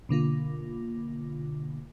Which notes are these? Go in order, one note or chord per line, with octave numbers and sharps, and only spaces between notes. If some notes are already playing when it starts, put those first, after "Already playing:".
B2 D3 A#3 F4